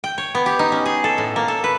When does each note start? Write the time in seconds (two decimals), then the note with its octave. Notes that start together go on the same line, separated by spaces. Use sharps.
0.04 G5
0.18 C#5
0.35 B3
0.46 G4
0.59 D#4
0.72 C#4
0.86 G#4
1.04 A4
1.18 A2
1.36 A#3
1.48 A4
1.64 B4